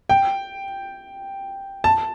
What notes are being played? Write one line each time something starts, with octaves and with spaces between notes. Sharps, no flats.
G5
A5